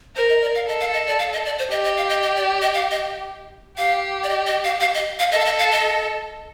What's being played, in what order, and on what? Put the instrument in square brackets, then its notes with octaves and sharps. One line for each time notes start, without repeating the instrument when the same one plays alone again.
[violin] A#4 [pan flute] C5
[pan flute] D#5
D5
F5
[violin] A4 [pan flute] D#5
[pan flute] F5
D#5
D5
F5
D#5
D5
C5
[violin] G4 [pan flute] D#5
[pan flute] D#5
F5
D#5
D#5
D5
D#5
F5
D#5
[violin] G4 [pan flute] F5
[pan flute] D5
D#5
D#5
F5
F5
D#5
F5
[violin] A4 [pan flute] D#5
[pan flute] F5
D#5
F5
D#5